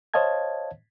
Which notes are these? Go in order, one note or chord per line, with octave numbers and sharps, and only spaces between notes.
C5 C#5 D#5 F5 A5 G#6